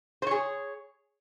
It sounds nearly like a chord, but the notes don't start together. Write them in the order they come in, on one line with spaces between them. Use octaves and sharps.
C5 C#5 G#4